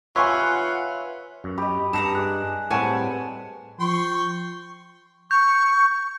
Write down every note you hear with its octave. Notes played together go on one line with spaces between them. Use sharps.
F4 B4 C#5 E5 F#5 G#5 C6 C#6
F#2
G4 D#5 B5
G2 A5 A#5 D#6
G#4 D5 F#6
A2 G3 C4 B4 C#5 F#5 G#5 A5
F3 G5 C6 C#6
C#6 G6